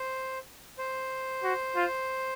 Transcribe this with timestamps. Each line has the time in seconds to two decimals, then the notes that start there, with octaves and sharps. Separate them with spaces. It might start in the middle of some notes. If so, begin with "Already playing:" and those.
Already playing: C5
0.78 C5
1.44 F#4
1.76 F4